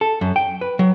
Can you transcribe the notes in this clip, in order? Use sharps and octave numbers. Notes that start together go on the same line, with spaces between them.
A4
F#2
G5
B4
F#3